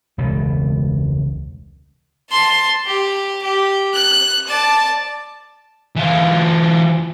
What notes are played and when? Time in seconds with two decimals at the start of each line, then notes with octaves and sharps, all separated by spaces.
0.18 E1 C#2 B2
2.30 A5 C6
2.86 G4
3.43 G4
3.94 F#6
4.47 D5 A5
5.96 E3 F4